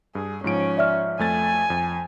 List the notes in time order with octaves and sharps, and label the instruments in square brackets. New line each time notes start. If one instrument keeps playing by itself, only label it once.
[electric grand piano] G2 [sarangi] G#4
[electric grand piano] G#2 F3 D7 [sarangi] C#4
[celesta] D5 E5 F6
[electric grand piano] F2 A3 A6 [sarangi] G#5
[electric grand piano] F2